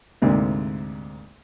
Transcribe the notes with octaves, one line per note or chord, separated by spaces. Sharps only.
D2 G#2 C3 A#3